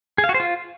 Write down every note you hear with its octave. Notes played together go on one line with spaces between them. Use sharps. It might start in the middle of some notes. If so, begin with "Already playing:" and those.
G#4
F5
F#4
C5
F4